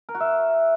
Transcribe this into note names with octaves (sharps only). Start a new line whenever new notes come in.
A#4
F#4
E5